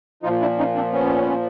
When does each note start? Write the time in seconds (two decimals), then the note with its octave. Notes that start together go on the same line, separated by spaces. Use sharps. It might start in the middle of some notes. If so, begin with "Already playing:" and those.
0.23 A#2 F3 D#4 F4
0.41 D4 E4
0.59 C#4 D#4
0.75 C4 D4
0.92 B3 C#4